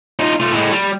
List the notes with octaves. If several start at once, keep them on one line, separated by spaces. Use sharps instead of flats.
D#4 F4
A3 F4
A2 G#3
G3